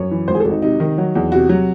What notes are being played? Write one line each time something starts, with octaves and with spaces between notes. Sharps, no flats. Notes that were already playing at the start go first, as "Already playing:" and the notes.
Already playing: F#2 C#5
E3
G#1 C5
G#4
G#1 A4
D#4
C3 D#4
D#3
F#3
E2
C3 F#4
F#3